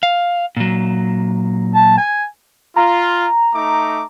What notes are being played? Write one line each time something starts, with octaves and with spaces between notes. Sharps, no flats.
F5
A#2 F#3
A5
G#5
F4 A#5
A3 D#4 D6